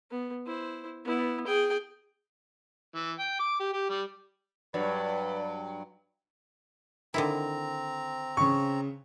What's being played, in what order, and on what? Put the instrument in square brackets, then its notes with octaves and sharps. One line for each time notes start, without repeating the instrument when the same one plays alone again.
[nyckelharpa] B3
E4 C5
B3 E4
G#4 G5
[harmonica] E3
G5
D6
G4
G4
G3
[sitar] G2 F#3 [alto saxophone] B4 [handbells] D5
[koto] D3 D#3 E4 [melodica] C4 A#5
[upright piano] C#3 C#6